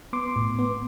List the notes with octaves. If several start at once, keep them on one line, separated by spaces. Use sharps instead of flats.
B3 C6 D6
A2
B3